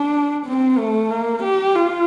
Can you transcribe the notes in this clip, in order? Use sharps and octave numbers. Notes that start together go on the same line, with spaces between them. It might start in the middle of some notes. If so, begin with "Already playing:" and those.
Already playing: D4
C4
A3
A#3
G4
F4